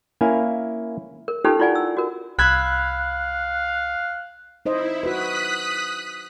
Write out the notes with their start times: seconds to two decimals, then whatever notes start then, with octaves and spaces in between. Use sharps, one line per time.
0.21 A#3 C#4 E4 F5 G#5
1.28 A#4
1.44 C#4 D#4 F4 G4 A4 B4
1.60 E4 F4 D5 F#5 G#5
1.75 E6
1.97 F#4 A#4
2.39 C2 F5 B5 E6 F#6 G#6
4.66 D#4 E4 C5 D#5
5.03 F#4 B4 D#6 F#6 B6